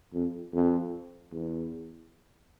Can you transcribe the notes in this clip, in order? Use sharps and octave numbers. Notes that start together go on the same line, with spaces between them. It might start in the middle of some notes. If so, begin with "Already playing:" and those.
F2
F2
E2